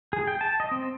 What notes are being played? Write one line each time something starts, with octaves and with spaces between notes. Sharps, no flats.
G#4
G5
A5
D#5
C4